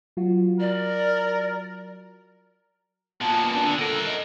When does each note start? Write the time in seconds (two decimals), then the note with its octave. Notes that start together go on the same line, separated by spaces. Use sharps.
0.17 F#3 F4 F#4
0.60 A#4 D5
3.21 A#2 B3 A5
3.54 D4
3.66 D3
3.79 A4 A#4 F#5
4.06 D#5